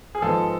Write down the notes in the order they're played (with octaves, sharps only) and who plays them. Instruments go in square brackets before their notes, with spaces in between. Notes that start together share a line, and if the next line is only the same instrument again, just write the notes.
[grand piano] G#4
G#2 F3 G#3 B3 A4